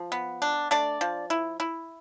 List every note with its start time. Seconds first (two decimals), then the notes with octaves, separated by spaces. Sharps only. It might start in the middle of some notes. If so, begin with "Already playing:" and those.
Already playing: F3
0.12 B3
0.42 D4
0.71 A3 D4 D5
1.01 F3
1.30 E4
1.60 E4